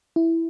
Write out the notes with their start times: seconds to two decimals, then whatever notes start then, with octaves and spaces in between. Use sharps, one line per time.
0.16 E4